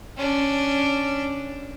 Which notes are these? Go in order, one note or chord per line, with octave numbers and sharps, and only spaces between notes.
C#4 D4